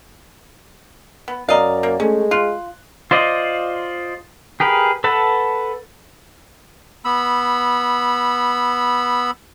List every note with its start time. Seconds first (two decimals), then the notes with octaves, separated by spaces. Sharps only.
1.28 B3
1.49 F#2 D5 D#5 F5 A#5
1.83 A#3
2.00 G#3 A3 C#4
2.31 F4 F#6
3.11 F4 C5 D5 D#5
4.60 G4 G#4 A#4 B4
5.04 A4 B4 F#5 A5
7.05 B3 B5 E6